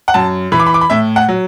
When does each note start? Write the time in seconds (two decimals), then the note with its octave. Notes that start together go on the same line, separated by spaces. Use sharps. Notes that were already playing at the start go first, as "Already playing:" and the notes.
0.08 F#5
0.14 F#2 A5
0.52 E3 B5
0.59 D6
0.67 B5
0.74 D6
0.81 B5
0.90 A2 E5
1.16 F#5
1.29 F#3